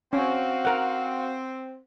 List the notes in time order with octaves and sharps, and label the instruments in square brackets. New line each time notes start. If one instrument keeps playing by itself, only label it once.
[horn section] C4 [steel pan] C#4 [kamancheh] F#4 F5
[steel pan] A#4 F#5